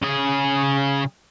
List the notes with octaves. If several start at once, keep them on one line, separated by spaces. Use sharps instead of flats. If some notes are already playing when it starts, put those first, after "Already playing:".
C#3 G#4